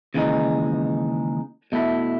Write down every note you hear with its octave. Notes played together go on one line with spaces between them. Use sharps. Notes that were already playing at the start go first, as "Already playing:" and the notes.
D#2 C#3 E3 G#3 D#4
B2 A3 E4